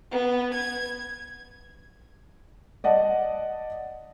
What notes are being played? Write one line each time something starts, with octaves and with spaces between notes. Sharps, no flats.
B3
G#6
D5 D#5 F#5 A5